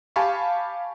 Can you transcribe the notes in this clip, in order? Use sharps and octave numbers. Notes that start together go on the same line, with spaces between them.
G4 F5 G#5 A5 B5 C#6